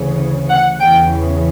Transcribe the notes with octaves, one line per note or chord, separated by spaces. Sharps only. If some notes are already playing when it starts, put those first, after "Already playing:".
Already playing: D2 C#3 E3
F#5
E2 C#3 E3 G5